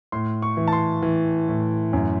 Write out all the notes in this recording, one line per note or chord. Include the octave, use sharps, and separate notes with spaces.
A2 C6
C#6
E3
A5
C6
E3
A2
F#2